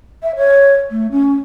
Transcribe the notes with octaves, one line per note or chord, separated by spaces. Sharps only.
E5
C#5
A3
C#4